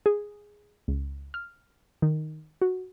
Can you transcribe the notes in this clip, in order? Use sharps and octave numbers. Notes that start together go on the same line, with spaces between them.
G#4
C#2
F6
D#3
F#4